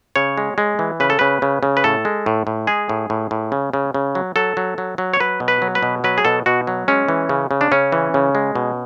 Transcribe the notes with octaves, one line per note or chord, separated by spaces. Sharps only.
C#3 C#5
G#3
G#3
E3
C#3 B4
A4
C#3 B4
C#3
C#3
B4
A2 A4
G#3
A2
A2
G#3 G#4
A2
A2
A2
C#3
C#3
C#3
F#3
F#3 A4
F#3
F#3
F#3
C#5
F#3 B4
B2
B4
F#3
B4
B2
F#3 B4
G#4
B2 A4
B2 F#4
F#3
G#3 C#4
E3
C#3
C#3
D4
C#3 C#4
E3
C#3
G#3
B2